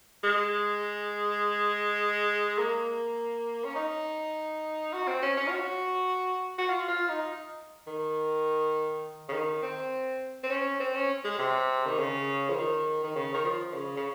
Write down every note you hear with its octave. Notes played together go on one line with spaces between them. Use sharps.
G#3
A#3
C#4
D#4
F#4
C4
C#4
C#4
F4
F#4
F#4
F4
F4
D#4
D#3
C#3
D#3
C4
C4
C#4
C4
C#4
G#3
C3
D#3
C#3
F3
D#3
D#3
C#3
D#3
F3
C#3
C#3